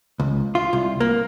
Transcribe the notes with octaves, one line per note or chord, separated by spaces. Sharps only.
C#2
F4
C2
A#3